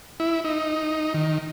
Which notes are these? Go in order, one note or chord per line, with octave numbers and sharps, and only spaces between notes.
E4
D#4
D#3